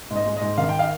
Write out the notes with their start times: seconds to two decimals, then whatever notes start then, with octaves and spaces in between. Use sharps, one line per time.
0.11 G#2 D#5
0.26 G#3
0.37 G#2 D#5
0.58 D#3 F5
0.69 G5
0.79 F5